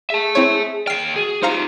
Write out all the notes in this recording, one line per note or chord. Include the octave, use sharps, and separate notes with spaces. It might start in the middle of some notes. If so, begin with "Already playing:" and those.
G#4 E5 A5
C4 E4 C#5
D#2 G5 F6 C7
F#4 G#4
D#4 F4 G4 C5 F5 A#5